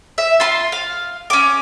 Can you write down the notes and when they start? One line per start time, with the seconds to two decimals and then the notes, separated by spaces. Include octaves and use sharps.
0.18 E5
0.40 F4 C6
0.72 F5
1.30 C#4 D6